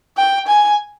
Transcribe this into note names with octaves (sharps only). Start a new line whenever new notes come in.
G5
G#5